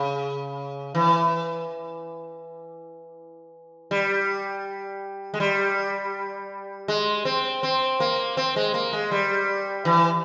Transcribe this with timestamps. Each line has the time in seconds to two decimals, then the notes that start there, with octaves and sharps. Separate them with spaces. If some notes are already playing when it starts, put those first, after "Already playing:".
Already playing: C#3
0.95 E3
3.91 G3
5.34 G#3
5.40 G3
6.88 G#3
7.25 C4
7.63 C4
8.00 A#3
8.37 C4
8.56 G#3
8.74 A#3
8.93 G#3
9.11 G3
9.85 E3